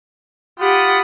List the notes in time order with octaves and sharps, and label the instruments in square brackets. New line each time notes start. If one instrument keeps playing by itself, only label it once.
[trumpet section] F4 B5 D#6 [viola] G4 F#5